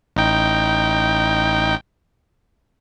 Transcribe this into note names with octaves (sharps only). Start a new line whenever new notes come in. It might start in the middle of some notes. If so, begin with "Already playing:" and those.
A1 D#4 G5